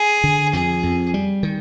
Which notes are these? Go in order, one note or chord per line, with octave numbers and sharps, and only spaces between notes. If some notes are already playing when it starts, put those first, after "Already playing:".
Already playing: G#4
D3
F2 G#4
F2
G3
D#3